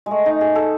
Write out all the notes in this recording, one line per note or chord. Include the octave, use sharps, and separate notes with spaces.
G#3 A3
D#4
G#4
A4